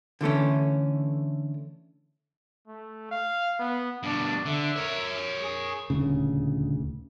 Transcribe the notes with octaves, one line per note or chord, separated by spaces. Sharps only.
D3 E3 A3 C#4
A3
F5
B3
G2 B2 D4
D3 E5
A#4 C#5
G#4
D#1 D2 C#3